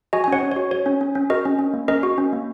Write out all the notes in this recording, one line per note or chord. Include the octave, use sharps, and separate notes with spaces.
F#4 D#5 G#5
G#5
C#4 C#5 F#5
C#4
F#4 C#5
F#4 C#5
C#4
C#4
C#4
F#4 A#4 D#5
C#4
C#4
A#3
C#4 A#4 D#5
F#4
C#4
A#3